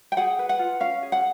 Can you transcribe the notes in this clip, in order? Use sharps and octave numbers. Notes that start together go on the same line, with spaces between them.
G5
G#4 F#5
B4
F#5
F4
C#4 F5
G#4
F#5